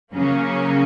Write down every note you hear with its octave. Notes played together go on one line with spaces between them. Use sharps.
C#3 F#3 A#3 C#4